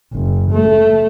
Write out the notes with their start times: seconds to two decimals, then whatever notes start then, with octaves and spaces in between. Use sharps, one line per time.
0.13 F#1
0.52 A3